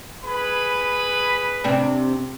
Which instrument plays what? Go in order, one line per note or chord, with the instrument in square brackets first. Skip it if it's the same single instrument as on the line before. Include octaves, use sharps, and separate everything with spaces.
[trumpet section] G#4 B4 B5
[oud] C3 C4 D4